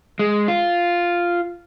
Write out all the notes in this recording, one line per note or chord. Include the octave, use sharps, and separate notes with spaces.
G#3
F4